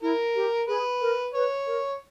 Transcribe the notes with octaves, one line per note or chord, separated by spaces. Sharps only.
E4 A#4
G4
G#4 B4
A#4
B4 C#5
A#4